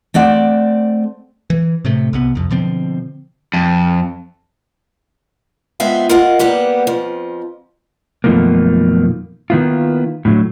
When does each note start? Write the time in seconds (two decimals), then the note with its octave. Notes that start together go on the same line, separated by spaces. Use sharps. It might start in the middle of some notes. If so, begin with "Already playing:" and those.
0.14 A3 C4 D5 F#5
1.50 E3
1.85 A2 C3 A3
2.13 C2 C3 B3
2.35 C2 F2
2.51 B2 D3 F3 C4
3.54 F2
5.80 G#3 B3 C4 F4 E5 F5
6.09 F4 A#4 D#5 F5 F#5
6.39 G3 A#3 B3 G4 F#5
6.87 F2 F3
8.24 F#2 B2 D#3 F3 A3 A#3
9.50 D#3 A#3 B3 E4 F4
10.25 A2 D3 F#3